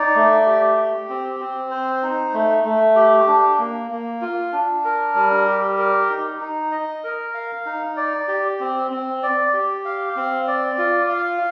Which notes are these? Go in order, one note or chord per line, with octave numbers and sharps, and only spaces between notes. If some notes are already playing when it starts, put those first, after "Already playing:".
Already playing: D#4 D5
A3
G4
G4
C4
C4
C5
D#4
A3
A3
G4
D4
A#3
A#3
F4
D4
A#4
G3
G4
A#4
D#4
D#4
D#5
A#4
F5
D#4
D5
G4
C4
C4
D5
G4
F5
C4
D5
F4
F5